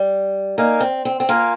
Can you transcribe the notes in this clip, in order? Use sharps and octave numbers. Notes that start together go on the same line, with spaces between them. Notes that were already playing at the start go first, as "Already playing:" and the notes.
Already playing: G3
A#3 D#4 A#4 F5 G#5
C4
C4
C4
A#3 F4 A#4 F5 G#5